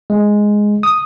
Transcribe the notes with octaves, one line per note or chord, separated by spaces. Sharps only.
G#3
D#6